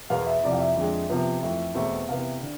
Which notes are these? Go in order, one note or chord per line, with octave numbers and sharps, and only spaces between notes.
E2 B2 B3 F5
E5
F2 C3 E3 D5
F5
E5
F2 D3 G#3
C3 F3 B3
F2 E3 A3 E5
E2 B2 A3 C4
C3 E3 B3 F5
D3